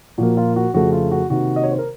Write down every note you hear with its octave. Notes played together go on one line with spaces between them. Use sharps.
A#2 F3 A#3 F#4
F4
F#4
F2 C#3 A3 F#4
F4
F#4
C3 D#3 A#3 F#4
D#5
C#5
C5
A#4